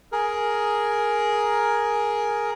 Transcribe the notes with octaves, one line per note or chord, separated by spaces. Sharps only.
G#4 A#4